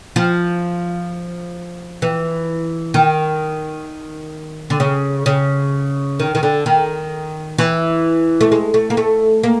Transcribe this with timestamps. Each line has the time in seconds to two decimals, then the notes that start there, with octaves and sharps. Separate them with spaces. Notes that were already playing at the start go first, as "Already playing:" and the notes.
0.16 F3
2.02 E3
2.94 D#3
4.70 D3
4.80 C#3
5.26 C#3
6.20 D#3
6.35 D#3
6.43 D3
6.66 D#3
7.58 E3
8.41 A3
8.52 G#3
8.74 A3
8.90 A#3
8.97 A3
9.43 A#3